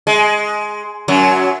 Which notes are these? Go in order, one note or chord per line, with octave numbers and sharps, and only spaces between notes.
G#3
F#2 F#3